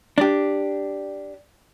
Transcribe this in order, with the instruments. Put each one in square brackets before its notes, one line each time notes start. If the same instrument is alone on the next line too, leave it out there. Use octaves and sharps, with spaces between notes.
[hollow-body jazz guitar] D4 G4